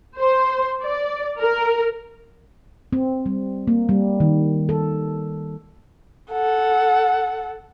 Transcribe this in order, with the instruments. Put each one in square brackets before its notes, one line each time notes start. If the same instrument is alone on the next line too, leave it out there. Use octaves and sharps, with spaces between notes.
[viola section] C5
D5
A#4
[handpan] C4
G3
A#3
G3
D#3
A4
[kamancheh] A4 F#5